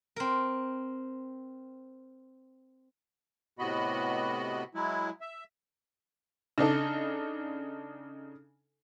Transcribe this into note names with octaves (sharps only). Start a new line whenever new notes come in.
C4 A#4
A2 C3 B3 F#4 D#5 B5
F#3 G#3 E4
E5
C#3 D4 D#4 A4